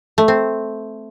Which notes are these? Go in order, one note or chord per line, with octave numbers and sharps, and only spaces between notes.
A3
C4